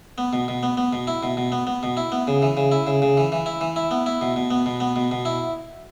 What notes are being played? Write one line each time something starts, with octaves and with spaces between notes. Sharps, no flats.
B3
B2
B2
B3
B3
B2
E4
B2
B2
B3
B3
B2
E4
B3
C#3
E3
C#3
E4
C#3
C#3
E3
E3
E4
E3
E4
B3
E4
B2
B2
B3
B2
B3
B2
B2
E4